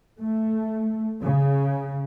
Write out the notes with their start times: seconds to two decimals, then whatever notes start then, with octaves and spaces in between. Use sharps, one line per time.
0.20 A3
1.22 C#3